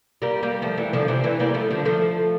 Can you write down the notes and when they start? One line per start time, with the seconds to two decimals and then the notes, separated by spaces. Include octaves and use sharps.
0.22 G3 A#3
0.43 G3 A#3
0.62 F3 A3
0.77 E3 G3
0.93 D3 F3
1.08 C3 E3
1.24 E3 G3
1.40 G3 A#3
1.54 F3 A3
1.70 D3 F3
1.85 F3 A3